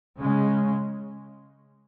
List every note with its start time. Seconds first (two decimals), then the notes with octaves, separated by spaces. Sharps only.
0.20 C#3 G#3 C#4